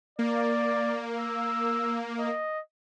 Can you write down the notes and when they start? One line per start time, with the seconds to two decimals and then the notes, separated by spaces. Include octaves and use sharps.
0.19 A#3 D5
1.18 E6
2.19 D#5